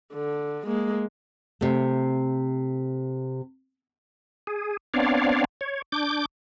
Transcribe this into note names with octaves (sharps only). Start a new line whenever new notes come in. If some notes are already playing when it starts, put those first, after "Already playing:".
D3
G#3 A#3
C3 A3
G#4
B3 C4 D4 C#5 D5 F5
C#5
D4 D6 G6